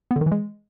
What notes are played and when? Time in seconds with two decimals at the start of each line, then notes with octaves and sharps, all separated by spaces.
0.11 B3
0.16 D3
0.21 D#3
0.26 E3
0.32 G#3